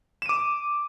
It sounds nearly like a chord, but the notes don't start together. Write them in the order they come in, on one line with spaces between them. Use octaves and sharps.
E7 D#7 D6